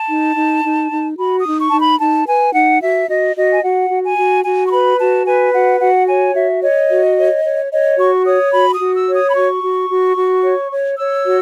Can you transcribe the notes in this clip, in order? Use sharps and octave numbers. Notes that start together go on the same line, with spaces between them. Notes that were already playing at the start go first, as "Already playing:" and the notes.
Already playing: A5
D#4
D#4
D#4
D#4
F#4 B5
D#6
D#4
C#6
D#4 A5
B5
D#4 A5
B4 G#5
D#4 F#5
F#4 E5
F#4 D#5
F#4 D#5
G#5
F#4 F#5
F#4
G#5
F#4
F#4 G#5
C#6
B4 B5
F#4 A5
B4 G#5
F#4 F#5
F#4 F#5
C#5 G#5
F#4 E5
C#5 D#5
F#4
C#5
C#5
C#5 D#5
F#4 C#6
C#5 D#6
F#4 B5
D#6
F#4
E6
C#5
D#6
B5
F#4 C#6
F#4
F#4
F#4
C#5
C#5
C#5 E6
F#4